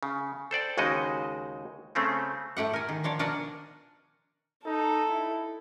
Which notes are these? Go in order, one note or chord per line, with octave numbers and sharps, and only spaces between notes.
C#3
A4 C5 D5 G5
D#2 C#3 G#3 D#4 F#4 D#5
C#3 A3 C4 C#4
A2 A3 G4 F#5
A#4 G#5
D#3
D#3 F3 D4 C#5 D5
B2 D4 F#4 A#4 F#5 G#5
D#4 A4
E4